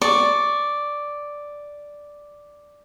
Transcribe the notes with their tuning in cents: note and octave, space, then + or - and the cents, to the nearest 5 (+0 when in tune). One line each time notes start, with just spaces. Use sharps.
D5 +0 C#6 +0